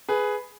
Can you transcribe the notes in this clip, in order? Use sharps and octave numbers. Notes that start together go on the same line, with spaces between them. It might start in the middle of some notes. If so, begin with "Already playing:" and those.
G#4 B4